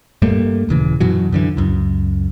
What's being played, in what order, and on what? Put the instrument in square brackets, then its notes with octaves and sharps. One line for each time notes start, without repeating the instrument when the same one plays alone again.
[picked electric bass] G2 G3 A3 A#3
D#1 C#3 E3
F#2 B2 E3 F#3
F#2 D3 E3
C#2 F#2